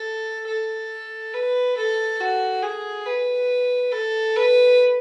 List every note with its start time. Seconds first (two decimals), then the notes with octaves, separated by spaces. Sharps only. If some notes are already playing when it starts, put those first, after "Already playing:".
Already playing: A4
0.47 A4
1.33 B4
1.77 A4
2.20 F#4
2.62 G#4
3.06 B4
3.92 A4
4.36 B4